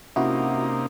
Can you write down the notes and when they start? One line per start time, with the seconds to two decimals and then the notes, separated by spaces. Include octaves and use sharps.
0.16 C3 A#3 C#4 D#4 E4 F#4